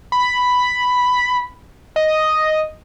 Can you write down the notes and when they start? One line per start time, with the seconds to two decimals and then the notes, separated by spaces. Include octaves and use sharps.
0.12 B5
1.96 D#5